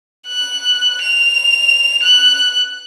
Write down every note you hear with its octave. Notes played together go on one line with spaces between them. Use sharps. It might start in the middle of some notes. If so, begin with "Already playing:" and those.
F#6
F7
F#6